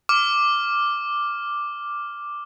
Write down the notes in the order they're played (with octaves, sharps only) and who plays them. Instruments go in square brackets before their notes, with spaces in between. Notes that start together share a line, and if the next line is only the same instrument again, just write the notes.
[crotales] D6 F6